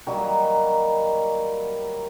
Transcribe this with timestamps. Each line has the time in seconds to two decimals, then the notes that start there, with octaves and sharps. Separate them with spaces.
0.07 D#3 F#3 G3 A#3